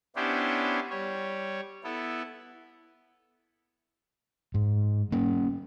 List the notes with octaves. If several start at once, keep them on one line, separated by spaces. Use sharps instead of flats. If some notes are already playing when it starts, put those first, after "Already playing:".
B3 C#4 D4 E4 G4 C5
G3 C#5
B3 E4 A4
G#2
A#3 C#4